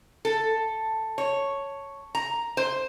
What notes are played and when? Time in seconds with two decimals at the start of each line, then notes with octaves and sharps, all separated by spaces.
0.25 A4
1.18 C#5
2.15 A#5
2.57 C5